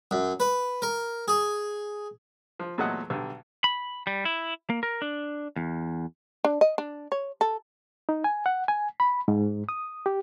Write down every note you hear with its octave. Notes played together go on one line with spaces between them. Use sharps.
F#2
B4
A#4
G#4
F3
E2 A#2 F#3 A3 D#5 F#5
B1 D3 G3
B5
G3
E4
A#3
A#4
D4
E2
D4
D#5
D4
C#5
A4
D#4
G#5
F#5
G#5
B5
G#2
D#6
G4